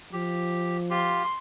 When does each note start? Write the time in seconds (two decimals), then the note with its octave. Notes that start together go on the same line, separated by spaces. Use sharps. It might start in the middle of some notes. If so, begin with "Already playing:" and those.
0.13 F3 G4
0.90 F4 G4 C6